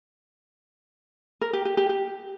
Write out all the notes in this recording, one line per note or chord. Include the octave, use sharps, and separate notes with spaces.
A#4
G4
G4
G4
G4